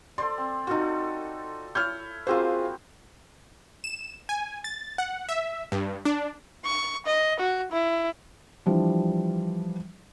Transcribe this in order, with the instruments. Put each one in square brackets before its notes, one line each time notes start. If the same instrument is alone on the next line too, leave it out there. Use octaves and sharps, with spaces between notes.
[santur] A4 C5 D5 [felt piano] C6
[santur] C4
[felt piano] D#4 F#4 [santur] F4 A4
[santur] E4 C#5 [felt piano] F6 G6
[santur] A#3 C4 F#4 [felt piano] F4 G#4 C5
[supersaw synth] E7
G#5
A6
F#5
E5
G2
D4
[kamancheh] C#6
D#5
F#4
E4
[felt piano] E3 F3 G3 D4